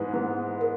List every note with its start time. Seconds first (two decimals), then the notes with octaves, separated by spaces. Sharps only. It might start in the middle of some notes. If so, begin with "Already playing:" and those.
Already playing: G#2 E3 G#3 B3 B4
0.13 G#2 E3 G#3 B3
0.61 A#4